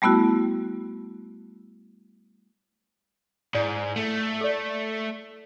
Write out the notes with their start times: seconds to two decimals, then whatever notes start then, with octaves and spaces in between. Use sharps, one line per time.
0.02 G3 A3 B3 E4 F#4
3.55 G#2 E4 D5
3.97 A3
4.41 A4 D5